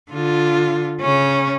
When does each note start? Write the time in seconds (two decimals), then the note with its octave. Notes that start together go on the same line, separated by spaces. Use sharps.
0.11 D3 F4
1.01 C#3 C#4